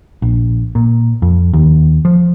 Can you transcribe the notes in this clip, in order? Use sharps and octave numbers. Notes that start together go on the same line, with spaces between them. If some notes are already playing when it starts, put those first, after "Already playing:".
A#1
A#2
F2
D#2
F3